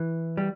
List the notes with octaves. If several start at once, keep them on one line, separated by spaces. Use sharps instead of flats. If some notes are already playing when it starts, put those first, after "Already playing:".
Already playing: E3
G3